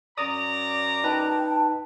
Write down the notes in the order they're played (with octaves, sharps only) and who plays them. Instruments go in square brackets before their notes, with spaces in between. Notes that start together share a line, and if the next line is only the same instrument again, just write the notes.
[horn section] F#2 D5 A#5 [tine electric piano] D#6
[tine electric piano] D#4 B4 [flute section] G5 A5